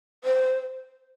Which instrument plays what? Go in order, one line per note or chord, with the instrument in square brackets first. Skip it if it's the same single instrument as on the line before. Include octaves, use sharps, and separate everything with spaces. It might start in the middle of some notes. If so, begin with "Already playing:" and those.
[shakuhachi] C5